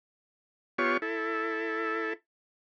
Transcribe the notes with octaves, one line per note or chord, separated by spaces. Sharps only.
B3 F4 G4 C#5 C#6
E4 A4